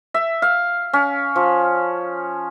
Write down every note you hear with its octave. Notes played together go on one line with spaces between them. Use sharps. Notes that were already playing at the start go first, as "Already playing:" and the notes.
E5
F5
C#4
F3